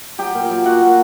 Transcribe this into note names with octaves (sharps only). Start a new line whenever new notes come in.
F#3 G4 G5
A#2
F#3
F#3 F#4 F#5
A#2